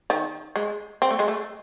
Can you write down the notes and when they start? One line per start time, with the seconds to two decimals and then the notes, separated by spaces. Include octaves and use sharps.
0.10 D#3
0.56 G#3
1.02 C4
1.11 A3
1.19 G#3
1.28 A3